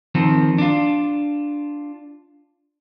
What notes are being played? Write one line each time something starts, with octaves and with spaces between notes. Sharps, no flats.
D#3 F3 C4
D4 F4